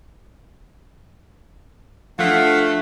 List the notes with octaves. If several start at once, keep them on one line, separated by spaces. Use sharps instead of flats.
F3 A3 D4 F5 F#5